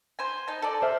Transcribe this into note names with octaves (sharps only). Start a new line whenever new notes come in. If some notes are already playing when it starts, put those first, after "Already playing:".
C5 G#5
D#4 A5
A4 D5
C5 E5 F6